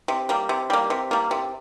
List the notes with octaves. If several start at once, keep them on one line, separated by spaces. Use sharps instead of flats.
C3
G3 A#3
C3
G3 A#3
C3
G3 A#3
C3